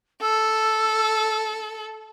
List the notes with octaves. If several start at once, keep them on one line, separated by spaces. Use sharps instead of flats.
A4 E6